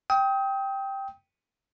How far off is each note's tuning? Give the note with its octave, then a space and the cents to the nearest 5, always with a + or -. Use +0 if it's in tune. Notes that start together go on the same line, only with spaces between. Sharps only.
G5 +0 D#6 +35